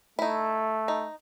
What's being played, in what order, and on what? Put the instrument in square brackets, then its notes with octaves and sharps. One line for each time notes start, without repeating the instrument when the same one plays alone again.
[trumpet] A3 [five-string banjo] D#4 E4
[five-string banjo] D#4